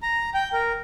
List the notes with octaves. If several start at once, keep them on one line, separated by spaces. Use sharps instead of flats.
A#5
G5
A#4